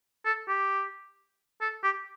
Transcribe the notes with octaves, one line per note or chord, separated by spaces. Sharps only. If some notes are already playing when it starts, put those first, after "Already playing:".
A4
G4
A4
G4